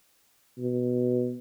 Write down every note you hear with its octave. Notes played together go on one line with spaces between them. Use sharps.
B2